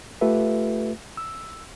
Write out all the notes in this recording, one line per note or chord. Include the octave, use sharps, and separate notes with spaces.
A3 F4 G4 A4 B4 E5
E6